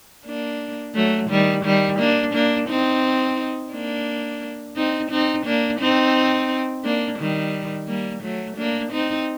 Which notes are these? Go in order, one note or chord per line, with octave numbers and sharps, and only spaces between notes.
A#3 D4
F#3 A3
D#3 G3
D#3 G3
A#3 D4
A#3 D4
C4 D#4
A#3 D4
C4 D#4
C4 D#4
A#3 D4
C4 D#4
A#3 D4
D#3 G3
G3 A#3
F#3 A3
A#3 D4
C4 D#4